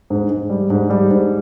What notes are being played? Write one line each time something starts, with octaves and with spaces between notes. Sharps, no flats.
G#2
G#2
G3
G#2
G3
G#2